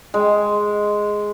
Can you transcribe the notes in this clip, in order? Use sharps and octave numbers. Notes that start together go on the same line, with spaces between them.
G#3